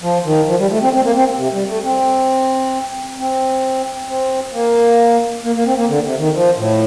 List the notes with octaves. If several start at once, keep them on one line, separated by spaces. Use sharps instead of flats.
F3
D#3
F3
G3
A3
C4
C4
A#3
C4
C3
G3
A3
C4
C4
C4
A#3
A#3
A#3
C4
A#3
D3
C3
D#3
F3
A2